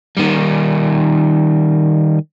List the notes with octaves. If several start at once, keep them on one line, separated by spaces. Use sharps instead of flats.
D#3 G3